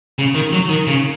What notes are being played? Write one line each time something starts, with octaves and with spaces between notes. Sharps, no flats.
C#3
D#3
F#3
D#3
C#3